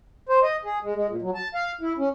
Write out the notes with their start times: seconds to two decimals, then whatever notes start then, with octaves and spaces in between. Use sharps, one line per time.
0.29 C5
0.43 D#5
0.65 G#4
0.82 G#3
0.95 G#3
1.09 A#2
1.22 F#3
1.35 A5
1.55 F5
1.81 E4
1.98 C#4